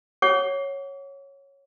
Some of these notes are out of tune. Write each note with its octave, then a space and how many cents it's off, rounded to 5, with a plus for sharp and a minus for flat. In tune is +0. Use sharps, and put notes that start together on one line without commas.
C#5 -5 F#5 +0 D6 -45